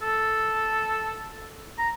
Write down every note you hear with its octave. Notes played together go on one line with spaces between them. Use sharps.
A4
A#5